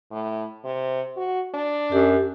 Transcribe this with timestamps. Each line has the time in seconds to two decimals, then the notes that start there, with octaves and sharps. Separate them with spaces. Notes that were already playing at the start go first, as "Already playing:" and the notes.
0.11 A2
0.65 C3
1.17 F#4
1.54 D4
1.92 F#2 G4